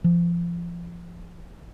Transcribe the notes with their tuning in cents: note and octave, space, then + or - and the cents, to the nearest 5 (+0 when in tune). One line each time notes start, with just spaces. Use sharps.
F3 -25